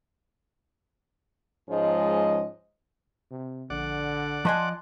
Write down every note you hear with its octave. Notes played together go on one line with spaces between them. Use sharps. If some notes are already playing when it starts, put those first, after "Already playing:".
G#2 F3 G#3 C#4 D#5
C3
A#1 D3 D5 F#5
F3 D#5 G#5 A5 C6 F#6